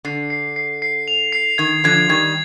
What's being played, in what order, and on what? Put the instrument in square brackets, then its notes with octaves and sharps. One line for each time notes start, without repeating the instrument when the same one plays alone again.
[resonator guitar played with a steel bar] D3 [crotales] C7
[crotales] C7
C7
C7
F7
C7
[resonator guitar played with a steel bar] D#3 [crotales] G#6
[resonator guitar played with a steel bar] D3 F3 [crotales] G#6
[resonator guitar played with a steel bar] D#3 G3 [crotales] G#6